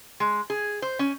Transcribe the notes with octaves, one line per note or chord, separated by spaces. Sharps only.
G#3
G#4
C5
C#4